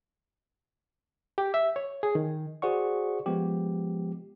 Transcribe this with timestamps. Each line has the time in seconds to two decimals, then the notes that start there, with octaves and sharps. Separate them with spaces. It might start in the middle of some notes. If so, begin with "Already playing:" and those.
1.38 G4
1.54 E5
1.76 C#5
2.03 G#4
2.15 D#3
2.62 F#4 G#4 C5 D5 F#5 C#6
3.26 F3 G#3 B3 G4